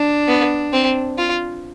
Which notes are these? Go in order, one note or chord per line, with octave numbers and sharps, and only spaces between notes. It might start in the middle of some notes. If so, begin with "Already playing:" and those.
Already playing: D4
B3
C4
F4